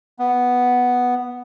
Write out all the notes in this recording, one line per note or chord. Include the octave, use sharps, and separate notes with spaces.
B3